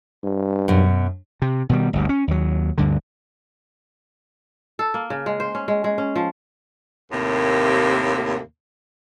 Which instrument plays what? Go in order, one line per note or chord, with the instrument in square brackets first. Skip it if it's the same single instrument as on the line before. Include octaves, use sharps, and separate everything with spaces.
[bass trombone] G2
[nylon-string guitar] F#2 B2
[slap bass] C3
B2 D#3 G3
G1 D2 G2
C#4
D#2 F#3
D2 G2 D3
[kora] A4
A#3
C#3
G#3
C5
C#4
G#3
G#3
C#4
F3
[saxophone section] D#2 A2 C3 A#3